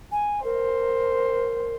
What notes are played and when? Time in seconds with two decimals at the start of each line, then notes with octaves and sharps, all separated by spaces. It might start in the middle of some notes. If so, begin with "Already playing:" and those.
0.12 G#5
0.44 A#4 C5